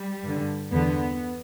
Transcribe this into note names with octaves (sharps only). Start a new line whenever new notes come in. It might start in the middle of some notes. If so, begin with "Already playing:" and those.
Already playing: G3
G2 D3
E2 D3 B3